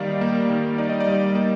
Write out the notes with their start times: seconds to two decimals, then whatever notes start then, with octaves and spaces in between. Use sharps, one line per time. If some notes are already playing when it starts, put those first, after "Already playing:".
Already playing: D#3 G3 A#3 D#4 D5 F5
0.21 A#3
0.50 D#3
0.78 D#4 D5
0.89 D#5
1.00 D5
1.07 G3
1.35 A#3